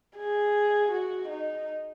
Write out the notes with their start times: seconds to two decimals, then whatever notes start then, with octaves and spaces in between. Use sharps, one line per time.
0.17 G#4
0.91 F#4
1.28 D#4